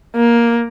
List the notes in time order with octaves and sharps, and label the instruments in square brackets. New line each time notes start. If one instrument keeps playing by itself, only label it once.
[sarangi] A#3